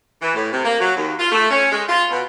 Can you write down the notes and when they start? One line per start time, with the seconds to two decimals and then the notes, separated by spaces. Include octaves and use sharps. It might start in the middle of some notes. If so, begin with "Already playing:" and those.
0.22 E3
0.34 A2
0.53 C3
0.65 A#3
0.80 F#3
0.97 D#2
1.19 F4
1.32 A3
1.51 C#4
1.72 G#3
1.89 F4
2.11 B2